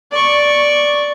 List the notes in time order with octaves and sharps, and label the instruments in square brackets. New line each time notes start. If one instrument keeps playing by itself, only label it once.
[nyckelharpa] D5 C#6